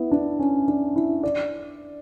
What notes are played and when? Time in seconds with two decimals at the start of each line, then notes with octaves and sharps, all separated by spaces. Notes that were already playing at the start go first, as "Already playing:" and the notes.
Already playing: B3 E4
0.11 D4
0.39 C#4
0.68 D4
0.96 E4
1.23 D5